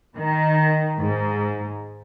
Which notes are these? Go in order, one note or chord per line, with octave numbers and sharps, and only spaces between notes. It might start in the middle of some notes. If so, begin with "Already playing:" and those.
D#3
G#2